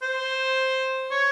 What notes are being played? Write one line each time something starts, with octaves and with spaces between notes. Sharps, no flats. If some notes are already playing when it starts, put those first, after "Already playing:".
C5
C#5